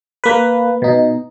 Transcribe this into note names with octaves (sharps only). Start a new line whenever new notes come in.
A#3 B4
B2 D#4